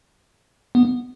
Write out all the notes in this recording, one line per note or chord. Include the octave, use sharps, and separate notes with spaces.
B3